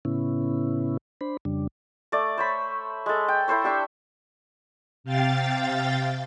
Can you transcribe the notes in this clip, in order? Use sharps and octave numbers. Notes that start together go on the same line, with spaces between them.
A2 C#3 B3 C#4 E4
D4 C5 B5
F2 C#3 G3 D4
A3 D5
C5 C#5 B5
G#3 A4
G5
E4 A4 C5 C#5
D4 G4 E5 C#6
C3 F5 G5 A6